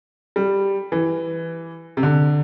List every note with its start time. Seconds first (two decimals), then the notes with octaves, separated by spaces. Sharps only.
0.36 G3
0.92 E3
1.97 C3
2.03 D3